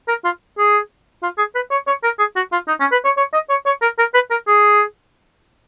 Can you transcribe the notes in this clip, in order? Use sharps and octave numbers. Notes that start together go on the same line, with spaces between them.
A#4
F4
G#4
F4
G#4
B4
C#5
C#5
A#4
G#4
F#4
F4
D#4
C#4
B4
C#5
C#5
D#5
C#5
C#5
A#4
A#4
B4
A#4
G#4